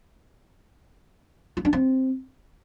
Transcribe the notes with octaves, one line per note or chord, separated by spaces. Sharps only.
F4
D4
C4